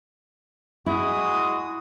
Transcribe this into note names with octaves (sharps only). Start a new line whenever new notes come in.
G#3 E4 F#4 D#6